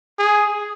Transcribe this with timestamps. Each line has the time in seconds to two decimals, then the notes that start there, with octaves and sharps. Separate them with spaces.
0.19 G#4